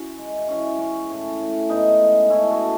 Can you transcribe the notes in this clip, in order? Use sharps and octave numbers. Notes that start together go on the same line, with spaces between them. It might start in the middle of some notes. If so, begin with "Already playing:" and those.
Already playing: C#4 E4 F#4
G#3
E3 C#4 E4
C#3 C#4
A2 C#4
A2
G#2 B3 D#4
G#3
A3 C#4 E4
F#4 A4